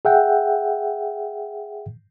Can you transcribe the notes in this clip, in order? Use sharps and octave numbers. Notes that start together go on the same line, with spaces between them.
G#4 E5 F#5 G5